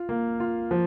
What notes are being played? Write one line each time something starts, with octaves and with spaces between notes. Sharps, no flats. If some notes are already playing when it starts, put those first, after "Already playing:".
Already playing: F4
A#3
F4
F3